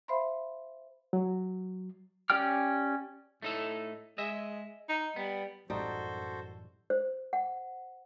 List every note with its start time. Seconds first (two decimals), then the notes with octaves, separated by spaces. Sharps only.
0.08 C5 E5 F5 B5 C6
1.13 F#3
2.30 C#4 G4 D5 G5 F6
3.42 A2 A3 D#4 A4
4.18 G#3 D#5 E5
4.89 D#4
5.16 G3 B3
5.70 A1 F#2 G3 D#4 F#4 A4 C5
6.90 C5
7.33 F#5